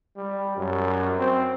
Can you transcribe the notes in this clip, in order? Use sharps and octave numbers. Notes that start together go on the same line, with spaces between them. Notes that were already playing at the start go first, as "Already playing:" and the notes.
G3
F#2
C4